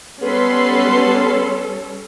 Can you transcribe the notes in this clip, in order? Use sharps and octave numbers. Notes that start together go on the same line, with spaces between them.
G3 B3 C#4 A4 B4 C6